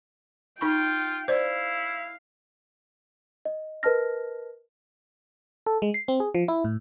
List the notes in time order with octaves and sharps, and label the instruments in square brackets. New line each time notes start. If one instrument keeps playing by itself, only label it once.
[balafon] D#4 B5 C#6 [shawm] F4 [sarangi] G5
[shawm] E4 [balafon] C5 D5 [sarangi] F5
[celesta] D#5
A#4 B4 D#5 A5 F6 A#6
[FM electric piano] A4
G#3
C7
C4
G#4
F3
E4
A2